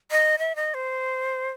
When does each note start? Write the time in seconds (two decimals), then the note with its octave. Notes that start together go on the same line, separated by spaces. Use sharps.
0.11 D#5
0.39 E5
0.56 D#5
0.74 C5